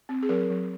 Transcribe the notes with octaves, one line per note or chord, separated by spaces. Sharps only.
C4
G#4
F#3 A#4
F#3